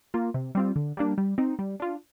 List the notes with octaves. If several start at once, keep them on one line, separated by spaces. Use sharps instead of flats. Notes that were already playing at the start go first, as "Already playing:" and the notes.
A#3 F4
C3
G3 C4 F4
D3
G3 A#3 D4
G3
C4 D#4
G3
D4 F4